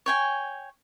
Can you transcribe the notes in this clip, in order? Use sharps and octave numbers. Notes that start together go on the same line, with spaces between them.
C#5 G5 G#5